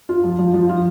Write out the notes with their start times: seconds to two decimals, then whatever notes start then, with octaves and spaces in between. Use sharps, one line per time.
0.09 F4
0.23 F3
0.39 F3
0.54 F3
0.69 F4